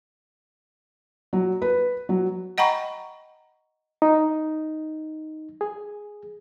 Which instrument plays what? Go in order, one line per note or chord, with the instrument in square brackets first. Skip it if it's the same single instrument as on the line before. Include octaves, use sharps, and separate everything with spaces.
[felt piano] F#3
B4
F#3
[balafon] D#5 F#5 G5 A#5 B5 C#6
[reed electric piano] D#4
G#4